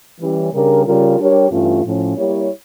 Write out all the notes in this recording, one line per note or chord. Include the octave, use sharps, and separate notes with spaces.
E3 G3 C#4
C#3 G3 D4 G4 A#4
C#3 G3 C#4 F4 A#4
G3 D4 G4 A#4 C#5
G2 E3 A3 C#4 F4
A2 F3 C#4
G3 A#3 E4 G4 C#5